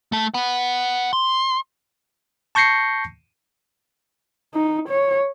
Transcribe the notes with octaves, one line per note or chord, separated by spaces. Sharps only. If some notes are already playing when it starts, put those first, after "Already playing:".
A3 A5
F#5 B5
C6
A5 C#6 G6 A#6 C7 C#7
D#4
C#5